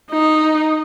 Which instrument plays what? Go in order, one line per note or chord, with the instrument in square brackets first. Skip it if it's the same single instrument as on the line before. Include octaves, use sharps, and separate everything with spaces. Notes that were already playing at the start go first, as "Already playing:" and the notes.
[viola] D#4